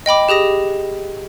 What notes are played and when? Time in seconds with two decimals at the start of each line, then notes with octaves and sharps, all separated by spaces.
0.06 D#5 G5 B5 D6
0.29 G4 G#4 D#6 A#6